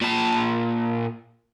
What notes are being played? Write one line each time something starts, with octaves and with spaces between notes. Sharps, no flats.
A#2 A5